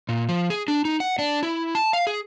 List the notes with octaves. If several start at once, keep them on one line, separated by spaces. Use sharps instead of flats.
A#2
F3
G#4
D4
D#4
F#5
D4
E4
A5
F5
G#4